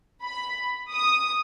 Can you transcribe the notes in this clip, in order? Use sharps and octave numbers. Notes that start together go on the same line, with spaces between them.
B5
D#6